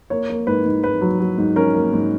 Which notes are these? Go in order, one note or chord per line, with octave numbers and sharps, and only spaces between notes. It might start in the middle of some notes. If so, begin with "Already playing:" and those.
A#3 C#5
A#3
G#2 B4
G#2
G#2 B4
F#3
F#3
G#2
C#4 A#4
A#3
G#2